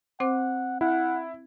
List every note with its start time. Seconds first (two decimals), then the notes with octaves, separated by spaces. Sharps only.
0.20 C4 C5 F#5 D6
0.81 E4 F#5